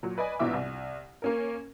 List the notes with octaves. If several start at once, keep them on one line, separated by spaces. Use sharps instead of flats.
A#2 F#3
B4 D5 D#5 G#5
A#1 G#2 B2 E3 E5 D6
C2
A#3 C#4 A#4